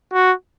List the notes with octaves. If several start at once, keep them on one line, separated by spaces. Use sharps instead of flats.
F#4